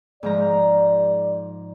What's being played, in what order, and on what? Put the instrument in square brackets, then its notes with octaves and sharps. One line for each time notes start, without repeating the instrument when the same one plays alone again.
[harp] G#2 F3 A#5 [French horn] D5